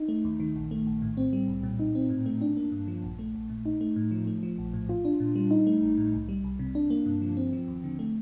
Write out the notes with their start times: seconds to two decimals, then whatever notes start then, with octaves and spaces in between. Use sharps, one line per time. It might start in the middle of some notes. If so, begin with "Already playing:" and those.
Already playing: D#4
0.08 A3
0.24 D#2
0.40 D#3
0.55 A#1
0.71 A3
0.87 A#1
1.02 A2
1.17 C4
1.33 G3
1.48 C2
1.63 A#2
1.79 D#4
1.95 C4
2.10 A2
2.26 A3
2.41 D4
2.57 A#3
2.72 G2
2.88 F3
3.03 A#1
3.19 A3
3.35 A#1
3.50 A#2
3.65 D#4
3.81 A3
3.96 A2
4.11 F3
4.27 A3
4.43 F3
4.58 A#1
4.74 A2
4.89 F4
5.05 D4
5.20 A#2
5.36 G3
5.51 D#4
5.67 A3
5.82 A1
5.97 A2
6.13 C2
6.29 G3
6.44 C2
6.59 C3
6.75 D4
6.90 A#3
7.06 G2
7.22 F3
7.37 C4
7.53 F3
7.68 D#2
7.84 D3
7.99 A3